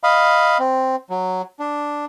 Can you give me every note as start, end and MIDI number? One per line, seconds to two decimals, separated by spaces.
0.03 0.58 75
0.03 0.58 77
0.03 0.58 83
0.60 0.96 60
1.10 1.42 54
1.60 2.05 62